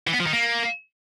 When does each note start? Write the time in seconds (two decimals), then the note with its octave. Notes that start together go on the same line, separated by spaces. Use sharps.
0.07 E3
0.13 B3
0.20 F3
0.26 D#3
0.33 A#3